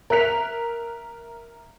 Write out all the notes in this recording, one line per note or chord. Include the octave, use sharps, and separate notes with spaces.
A#4 E5 F#6 B6 F7